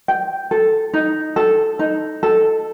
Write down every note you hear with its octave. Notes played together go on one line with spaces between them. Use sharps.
G5
A4
D#4
A4
D#4
A4